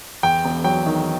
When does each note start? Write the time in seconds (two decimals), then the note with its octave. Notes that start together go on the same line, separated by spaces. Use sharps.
0.23 E2 G5
0.45 E1
0.64 F#3 G5
0.86 D#3